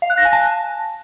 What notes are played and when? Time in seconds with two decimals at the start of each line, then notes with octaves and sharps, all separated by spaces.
0.02 F5
0.10 F#6
0.17 A#6
0.25 G#5
0.33 A5